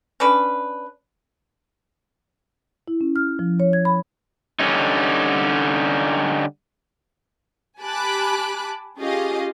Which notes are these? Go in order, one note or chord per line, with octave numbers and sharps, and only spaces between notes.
C#4 D4 B4
E4
C#4
F6
F3
C#5
G#6
B5
D3 G3 C#4 D#4
G4 G#5 A5 B5 D6 F#6
C#4 F4 G4 G#4 D#5 F5